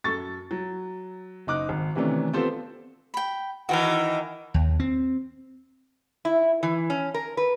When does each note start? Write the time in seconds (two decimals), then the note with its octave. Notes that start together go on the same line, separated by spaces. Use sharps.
0.04 F#2 A4 C#6 A6
0.51 F#3
1.47 F#1 D#4 D6 F#6
1.69 G#1
1.95 C3 D#3 E3 A3 C#4 D4
2.33 B3 C4 F4 G4 A4 C5
3.14 G5 B5
3.69 D#3 E3 F#4 A#4
4.54 D#2
4.80 C4
6.25 E4
6.63 E3
6.90 C#4
7.14 A#4
7.37 B4